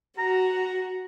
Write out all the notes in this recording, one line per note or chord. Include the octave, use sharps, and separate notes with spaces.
F#4 A#5